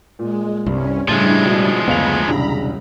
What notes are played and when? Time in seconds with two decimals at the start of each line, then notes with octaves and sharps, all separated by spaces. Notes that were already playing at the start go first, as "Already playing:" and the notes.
0.19 A#2 G#3
0.66 C2 G2 C3 C#4
1.09 A2 C#3 F3 G3 G#3 D4 E4
1.46 B2
1.88 F#1 D2 B3 F5 A#5 B5 F7
2.28 E1 C2 C#3 D4